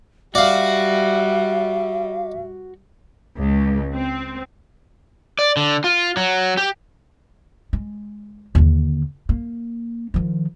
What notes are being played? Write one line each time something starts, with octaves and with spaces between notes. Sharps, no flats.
G3 F#4 D5 E5 F5
C#2
C4
D5
D3
F4
F#3
G4
G#3
D#2 D3
A#3
D#3 F3